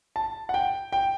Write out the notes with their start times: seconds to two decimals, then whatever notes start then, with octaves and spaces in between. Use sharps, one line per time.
0.16 A5
0.49 F#5
0.54 G5
0.92 G5